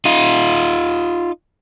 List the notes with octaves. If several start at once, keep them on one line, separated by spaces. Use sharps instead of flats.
D#4 F4